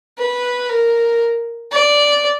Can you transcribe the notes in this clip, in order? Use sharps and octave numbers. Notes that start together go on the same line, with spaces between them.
B4
A#4
D5